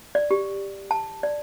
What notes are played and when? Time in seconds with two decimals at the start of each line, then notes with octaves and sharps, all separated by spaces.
0.15 D5
0.31 G4
0.91 A5
1.23 D5